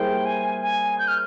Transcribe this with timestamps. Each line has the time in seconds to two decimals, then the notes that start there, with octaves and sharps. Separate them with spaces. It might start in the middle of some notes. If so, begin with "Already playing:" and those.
Already playing: G3 A#3 E4 G#4 C5 G5
0.25 G#5
0.62 G#5
0.99 G6
1.08 F6